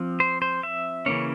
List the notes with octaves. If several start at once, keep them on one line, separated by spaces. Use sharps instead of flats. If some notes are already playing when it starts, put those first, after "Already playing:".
Already playing: F3 C4
C5
C5
E5
C#3 E3 A#3 C#4 C#5